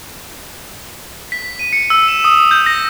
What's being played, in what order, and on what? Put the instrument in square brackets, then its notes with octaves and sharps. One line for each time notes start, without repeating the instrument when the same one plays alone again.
[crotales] B6
D#7
C#7
E6
E7
D#6
G6
A#6